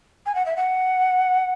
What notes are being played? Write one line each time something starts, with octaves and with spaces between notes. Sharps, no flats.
G#5
F#5
E5
F#5